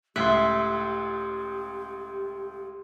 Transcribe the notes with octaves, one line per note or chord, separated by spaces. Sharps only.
C#2 A2 G4 E5 C6 F#6